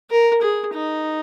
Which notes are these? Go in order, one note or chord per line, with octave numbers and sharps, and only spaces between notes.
A#4
G#4
D#4